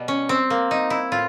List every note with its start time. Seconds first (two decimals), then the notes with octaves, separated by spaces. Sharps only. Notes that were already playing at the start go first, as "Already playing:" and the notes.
Already playing: B2 G3
0.08 C#4
0.29 C4
0.50 A#3
0.71 D#4
0.90 E4
1.12 A2 F4